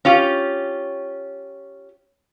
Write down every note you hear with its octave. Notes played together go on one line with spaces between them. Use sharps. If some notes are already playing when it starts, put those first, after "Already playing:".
C#4 F4 G4